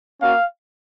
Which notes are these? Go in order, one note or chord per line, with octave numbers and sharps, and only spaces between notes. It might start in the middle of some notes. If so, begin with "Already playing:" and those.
A#3 C#4 F#4 F5